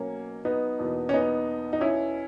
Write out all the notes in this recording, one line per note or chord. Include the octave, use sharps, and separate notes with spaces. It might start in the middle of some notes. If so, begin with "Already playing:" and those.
Already playing: B2 F#3 A#3 C#4
B3 D#4
E2 B2 A#3
C#4
B3 D#4
D#4
C#4 E4